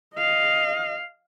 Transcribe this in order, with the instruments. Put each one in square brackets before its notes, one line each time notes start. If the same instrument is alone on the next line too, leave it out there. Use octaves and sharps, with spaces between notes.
[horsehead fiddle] D#5 F5